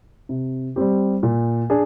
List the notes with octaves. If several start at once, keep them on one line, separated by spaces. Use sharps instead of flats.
C3
G3 C4 G4
A#2
D4 G#4